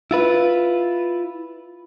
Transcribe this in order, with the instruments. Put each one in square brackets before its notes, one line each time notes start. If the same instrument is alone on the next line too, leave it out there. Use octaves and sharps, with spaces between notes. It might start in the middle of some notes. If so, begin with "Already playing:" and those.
[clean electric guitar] E4 F4 B4